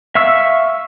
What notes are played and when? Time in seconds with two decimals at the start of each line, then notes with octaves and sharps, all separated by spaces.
0.15 E5 F5 C#6 E6